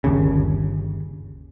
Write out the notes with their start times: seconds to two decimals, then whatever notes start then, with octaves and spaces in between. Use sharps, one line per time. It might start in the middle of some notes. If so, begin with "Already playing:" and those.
0.04 G1 D#2 C#3